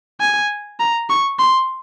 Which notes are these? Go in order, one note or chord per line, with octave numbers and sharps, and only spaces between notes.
G#5
A#5
C#6
C6